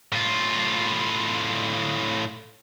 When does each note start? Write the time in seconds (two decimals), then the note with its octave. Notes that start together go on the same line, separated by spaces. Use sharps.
0.12 A2 F4